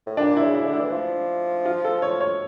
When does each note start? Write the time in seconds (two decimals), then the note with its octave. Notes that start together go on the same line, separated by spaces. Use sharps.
0.07 A2
0.17 A#2 D4
0.37 E4
0.42 C#3
0.55 E4
0.63 C#3
0.67 D3
0.73 E4
0.80 E3
0.92 F3
1.65 F4
1.85 A4
2.02 C#5
2.21 C#5